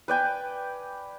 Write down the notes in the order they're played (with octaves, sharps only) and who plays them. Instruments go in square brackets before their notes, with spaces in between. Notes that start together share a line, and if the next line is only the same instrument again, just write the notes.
[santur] B4 D5 G5 G#5